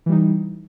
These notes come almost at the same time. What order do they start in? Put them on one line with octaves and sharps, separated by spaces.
E3 G3 D#4